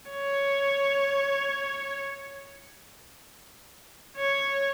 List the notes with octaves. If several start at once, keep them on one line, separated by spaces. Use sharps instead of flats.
C#5
C#5